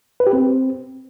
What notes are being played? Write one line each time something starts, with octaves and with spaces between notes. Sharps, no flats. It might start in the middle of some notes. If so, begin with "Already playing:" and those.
B4
G4
C4